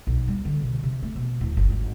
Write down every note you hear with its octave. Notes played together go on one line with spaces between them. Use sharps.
B1
G3
D3
B2
C3
A3
B2
D1
G1
G#1